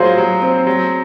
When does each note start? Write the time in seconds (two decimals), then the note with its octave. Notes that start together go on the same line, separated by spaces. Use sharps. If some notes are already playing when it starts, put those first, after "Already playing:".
Already playing: F#3 F4 F#4 G#4 C5
0.18 F#3
0.42 C4
0.67 F#3